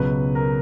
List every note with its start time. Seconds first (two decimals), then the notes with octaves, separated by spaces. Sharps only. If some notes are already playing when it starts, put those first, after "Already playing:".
Already playing: C#2 B2 F#3 B4
0.35 A#4